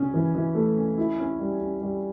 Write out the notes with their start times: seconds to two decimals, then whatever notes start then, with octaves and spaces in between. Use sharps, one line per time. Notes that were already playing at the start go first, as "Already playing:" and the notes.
Already playing: C#3 C#4
0.14 E3
0.35 E3
0.55 A3
0.77 C#4
0.98 E4
1.19 C#4
1.39 G3
1.60 C#4
1.81 G3